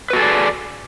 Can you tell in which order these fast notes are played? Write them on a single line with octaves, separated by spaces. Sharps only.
B4 F#4 A4 G#4 D5